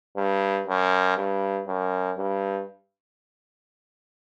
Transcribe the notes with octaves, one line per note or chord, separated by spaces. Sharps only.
G2
F#2
G2
F#2
G2